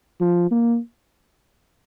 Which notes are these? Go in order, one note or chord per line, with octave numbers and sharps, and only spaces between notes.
F3
A#3